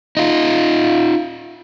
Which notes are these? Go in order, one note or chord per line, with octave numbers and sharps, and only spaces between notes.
D#4 F4